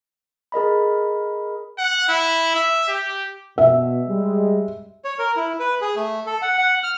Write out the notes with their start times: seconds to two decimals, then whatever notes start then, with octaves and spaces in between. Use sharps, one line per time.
0.52 G#4 A#4 D#5 B5
1.78 F#5
2.09 E4
2.55 E5
2.88 G4
3.58 B2 E5
4.07 G3 G#3
5.05 C#5
5.19 A#4
5.37 E4
5.60 B4
5.82 G#4
5.96 A3
6.26 A4
6.42 F#5
6.58 F#5
6.83 F6